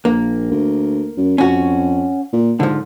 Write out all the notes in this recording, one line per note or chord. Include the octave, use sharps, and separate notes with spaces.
A#1 A#3
D2
F#2
F2 C#4 F#4
A#2
G#2 D3 F3